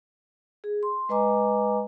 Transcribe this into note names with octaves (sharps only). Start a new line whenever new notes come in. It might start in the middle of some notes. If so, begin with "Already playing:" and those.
G#4
C6
G#3 B4 D#5 G#5 A#5 D6